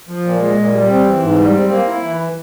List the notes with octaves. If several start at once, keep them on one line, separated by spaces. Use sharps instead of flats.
F3
A#2
G#3
A#2
G3
C4
E3
G#2
G3
C4
A#3
E4
E3